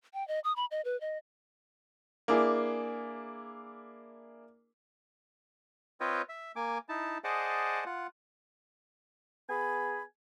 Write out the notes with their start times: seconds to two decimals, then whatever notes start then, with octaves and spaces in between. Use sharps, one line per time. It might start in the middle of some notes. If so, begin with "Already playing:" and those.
0.14 G5
0.28 D#5
0.44 D#6
0.56 B5
0.71 D#5
0.85 B4
1.01 D#5
2.28 A#3 D4 E4 G#4
6.01 C4 F4 B4 C#5 D#5 G5
6.29 E5
6.56 A#3 G#5 D6
6.89 D#4 E4 A5
7.24 G#4 C5 D5 D#5 F#5 A5
7.86 F4 F#5
9.49 B3 G#4 G#5 B5